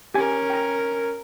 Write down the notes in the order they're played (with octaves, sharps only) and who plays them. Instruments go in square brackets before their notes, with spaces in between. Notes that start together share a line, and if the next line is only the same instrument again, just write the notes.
[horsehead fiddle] C#4 A#4 [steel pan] G4 G#5
[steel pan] G5 A#5